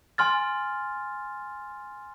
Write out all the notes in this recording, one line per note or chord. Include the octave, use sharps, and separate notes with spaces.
G#5 C6 F6 A6